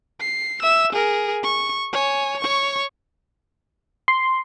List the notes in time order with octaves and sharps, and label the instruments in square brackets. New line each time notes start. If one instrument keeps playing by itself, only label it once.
[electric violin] C7
E5 E6
G#4 A#4
C#6
C#5 G#5
C#5 C#6
[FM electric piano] C6